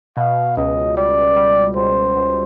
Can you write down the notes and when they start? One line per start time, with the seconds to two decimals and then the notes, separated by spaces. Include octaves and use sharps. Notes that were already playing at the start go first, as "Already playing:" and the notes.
0.17 B2 F5
0.57 C#2 D#5
0.97 G3 D5
1.36 G3
1.76 C#2 C5
2.17 C#2